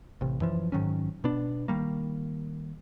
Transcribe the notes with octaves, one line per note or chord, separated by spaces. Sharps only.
A1 C3
F#2 E3 F3
G#2 D#3 F#3 C#4
B2 B3 D4
D#3 G3 A#3